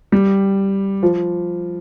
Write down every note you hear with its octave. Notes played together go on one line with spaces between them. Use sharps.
G3
F3